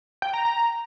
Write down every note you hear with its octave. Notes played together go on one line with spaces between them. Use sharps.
G5
A#5
A#5